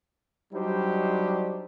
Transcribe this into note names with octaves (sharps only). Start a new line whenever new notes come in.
F#3 G3 D4 D#4 G4 C5